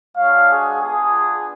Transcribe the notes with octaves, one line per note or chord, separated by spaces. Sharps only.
G#3 D4 F#4 C#5 F5
G#4
B3 D4 F4 G#4